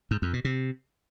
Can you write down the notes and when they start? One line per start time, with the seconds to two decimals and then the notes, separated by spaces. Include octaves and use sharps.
0.11 G#2
0.22 F2
0.33 B2
0.45 C3